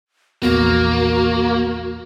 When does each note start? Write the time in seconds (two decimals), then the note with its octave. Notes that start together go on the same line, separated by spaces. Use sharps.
0.43 A#1 E2 A#3 B3 F#4